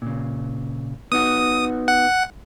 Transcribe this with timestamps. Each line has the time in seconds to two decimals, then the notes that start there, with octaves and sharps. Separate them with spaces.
0.02 A#2 C#3
1.12 B3 D#4 F#4 D#6
1.88 F#5